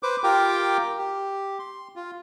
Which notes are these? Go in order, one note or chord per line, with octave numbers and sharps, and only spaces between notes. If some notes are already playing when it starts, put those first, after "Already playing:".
B4 C5 D6
F4 G4 A#4 G5 D6
G4
C6
F4